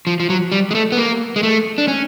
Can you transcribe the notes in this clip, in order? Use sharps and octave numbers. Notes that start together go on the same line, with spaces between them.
F3
F3
F#3
G3
G#3
A3
B3
A#3
G#3
A3
D4
C#4